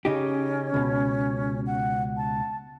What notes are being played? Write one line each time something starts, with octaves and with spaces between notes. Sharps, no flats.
C#3 C#4 D#4 G4
C#2 B2
F#5
A5